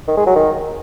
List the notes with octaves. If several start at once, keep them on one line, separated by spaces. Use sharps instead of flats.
D#3
G#3
F#3
D#3